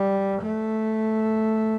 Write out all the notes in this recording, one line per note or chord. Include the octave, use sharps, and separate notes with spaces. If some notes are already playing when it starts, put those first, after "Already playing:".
Already playing: G3
A3